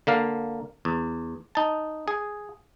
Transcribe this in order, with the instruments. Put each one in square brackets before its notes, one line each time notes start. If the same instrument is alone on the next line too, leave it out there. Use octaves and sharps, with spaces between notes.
[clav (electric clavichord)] D3 A#3 F5
E2
D#4 A5
G#4